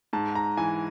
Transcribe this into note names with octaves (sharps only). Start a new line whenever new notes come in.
G#2 A5
A#5
E3 G#5